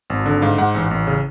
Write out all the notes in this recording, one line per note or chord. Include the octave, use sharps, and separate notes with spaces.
G#1
D3
G#2 F5
G#2 F#5
A1
A1
C#3